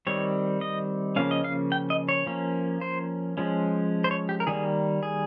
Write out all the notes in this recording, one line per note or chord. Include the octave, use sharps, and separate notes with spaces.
D#3 G3 C4 C#5
D#5
C#3 F3 A#3 C#4 F5
D#5
F5
G5
D#5
C#5
F3 A#3 C#4
C5
F3 G#3 C#4
C5
C#5
G4
A#4
D#3 G3 A#3 G#4
G#4